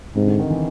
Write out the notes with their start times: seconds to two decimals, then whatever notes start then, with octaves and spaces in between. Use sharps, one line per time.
0.16 G#2 C3
0.27 D3
0.39 D#3
0.50 E3